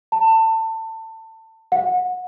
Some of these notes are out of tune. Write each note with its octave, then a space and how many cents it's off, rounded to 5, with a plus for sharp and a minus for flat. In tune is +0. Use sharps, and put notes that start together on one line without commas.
A5 +25
F#5 -25